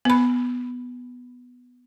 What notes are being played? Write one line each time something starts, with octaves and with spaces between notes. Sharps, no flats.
B3 B5